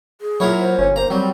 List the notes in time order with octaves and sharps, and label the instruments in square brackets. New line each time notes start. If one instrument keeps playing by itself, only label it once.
[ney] G#4
[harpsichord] A#2 A#4 C#5 [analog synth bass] F#3 [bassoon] E4
[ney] C5
[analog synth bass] G1 [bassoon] C#4
[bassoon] A#3 [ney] C5 [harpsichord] A#5
[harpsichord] F#3 [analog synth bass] G3 [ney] C4